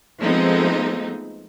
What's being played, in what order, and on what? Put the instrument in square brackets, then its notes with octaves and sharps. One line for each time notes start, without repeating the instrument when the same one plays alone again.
[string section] F3 G#3 A3 B3 C4 D#4